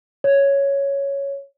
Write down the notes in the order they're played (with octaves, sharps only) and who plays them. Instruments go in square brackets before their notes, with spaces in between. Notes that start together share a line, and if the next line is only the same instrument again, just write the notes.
[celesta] C#5